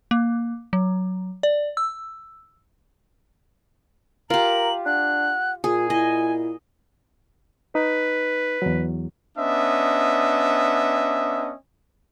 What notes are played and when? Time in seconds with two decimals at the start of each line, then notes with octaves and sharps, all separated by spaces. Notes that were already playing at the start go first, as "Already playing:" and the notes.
0.11 A#3
0.73 F#3
1.43 D5
1.77 E6
4.30 F4 G4 A#4 A#5 F#7
4.86 D4 F#5 F#6
5.64 A#2 F4 G#4
5.90 E4 D#5 G#5
7.75 D#4 B4
8.62 E2 F#3
9.37 B3 C#4 D4 D#5 E5